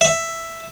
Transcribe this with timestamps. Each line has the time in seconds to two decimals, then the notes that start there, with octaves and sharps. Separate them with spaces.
0.01 E5